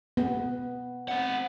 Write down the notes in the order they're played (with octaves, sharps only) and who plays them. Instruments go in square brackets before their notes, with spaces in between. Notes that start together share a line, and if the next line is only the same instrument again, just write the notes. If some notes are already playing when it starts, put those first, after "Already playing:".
[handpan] B3
[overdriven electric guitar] C4 F#5